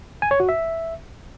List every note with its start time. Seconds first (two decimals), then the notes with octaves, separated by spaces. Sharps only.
0.22 G#5
0.31 C#5
0.40 F#4
0.49 E5